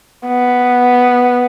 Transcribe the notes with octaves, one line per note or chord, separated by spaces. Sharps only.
B3